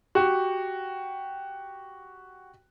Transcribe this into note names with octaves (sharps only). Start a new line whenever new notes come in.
F#4 G4